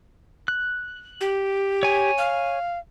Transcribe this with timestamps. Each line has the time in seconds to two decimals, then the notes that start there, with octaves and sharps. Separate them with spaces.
0.48 F#6
1.21 G4
1.83 C#5 G#5
2.18 F5